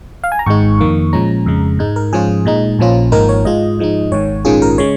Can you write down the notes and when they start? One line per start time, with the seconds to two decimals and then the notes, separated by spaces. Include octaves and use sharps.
0.24 F5
0.32 G#5
0.39 A#5
0.46 G#1 G#2 G#3 D#4 C#6
0.79 F2 D#3 A#3
1.13 A#2 F3 G#3 C#4 A#5
1.46 F2 C#3 G#3
1.79 G#2 G#3 D#4
1.96 A#4
2.13 G#2 F3 C#4 F4 G#4
2.45 A#2 G#3 D#4
2.79 A#1 A#2 F3 C#4 F4
3.12 G#1 G#2 F3 A#3 D#4 A#4
3.29 C#5
3.45 G#2 G#3 F4 D#5
3.79 G#2 F3 G#3 D#4
4.12 G#1 G#2 D#3 C#5
4.45 A#1 G#2 D#3 C#4 F4 G#4
4.62 A#4
4.78 C#3 G#3 C#5